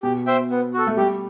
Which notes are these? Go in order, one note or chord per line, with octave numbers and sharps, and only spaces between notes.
B2 G4
C5 E5 G5
B3
F#4 A4
A3
G3 G4